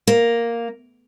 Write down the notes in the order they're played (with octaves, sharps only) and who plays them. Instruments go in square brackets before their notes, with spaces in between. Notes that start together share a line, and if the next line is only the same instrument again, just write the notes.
[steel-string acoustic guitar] A#3